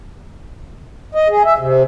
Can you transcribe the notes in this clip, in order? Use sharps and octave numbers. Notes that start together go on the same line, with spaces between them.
D#5
G#4
E5
C3